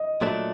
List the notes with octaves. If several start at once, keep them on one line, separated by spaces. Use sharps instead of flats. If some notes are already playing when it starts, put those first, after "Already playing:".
Already playing: D#5
A#2 F#3 A3 D4